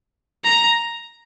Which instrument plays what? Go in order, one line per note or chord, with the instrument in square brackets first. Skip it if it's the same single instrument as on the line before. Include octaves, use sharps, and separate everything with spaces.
[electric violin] A#5